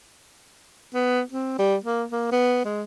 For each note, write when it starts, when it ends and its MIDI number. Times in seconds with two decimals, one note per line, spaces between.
0.94 1.21 59
1.32 1.56 60
1.59 1.76 55
1.84 2.04 58
2.12 2.31 58
2.31 2.61 59
2.65 2.83 56